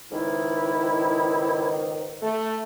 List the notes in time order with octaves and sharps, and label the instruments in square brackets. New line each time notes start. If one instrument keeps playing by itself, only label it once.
[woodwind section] C#2 G#2 D#3 [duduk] E4
[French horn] A3 [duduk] A4